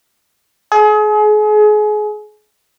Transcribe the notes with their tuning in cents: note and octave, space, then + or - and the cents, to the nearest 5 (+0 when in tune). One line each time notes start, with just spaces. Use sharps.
G#4 +30